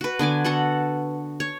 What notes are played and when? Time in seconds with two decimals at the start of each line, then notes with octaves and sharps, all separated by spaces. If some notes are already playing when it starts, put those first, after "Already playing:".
0.01 F#4 B4
0.19 D3 B3 G#5 D6
0.44 B3 F#4 A4 F#5
1.40 C#5